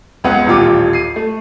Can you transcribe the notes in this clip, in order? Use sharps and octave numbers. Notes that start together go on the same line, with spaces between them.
C#2 B3 F#5
D#1 A1 F4 D6
C7 D#7
A3